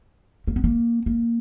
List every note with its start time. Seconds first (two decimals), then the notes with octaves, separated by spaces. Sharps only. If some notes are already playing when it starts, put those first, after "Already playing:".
0.47 A#3
0.56 B3
0.64 A#3
1.06 A#3